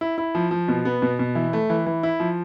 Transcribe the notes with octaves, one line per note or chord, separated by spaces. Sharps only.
E4
E4
F3
F3
B2
B3
B2
B2
E3
A3
E3
E3
E4
F3